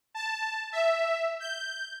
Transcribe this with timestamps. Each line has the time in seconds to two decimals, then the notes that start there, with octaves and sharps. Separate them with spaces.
0.15 A5
0.72 E5
1.40 G6